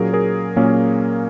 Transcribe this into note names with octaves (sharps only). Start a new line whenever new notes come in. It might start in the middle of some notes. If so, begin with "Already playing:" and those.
Already playing: A#2 F#3 A#3 C#4 G#4 A#4
G#4 A#4
A#2 F#3 A#3 C#4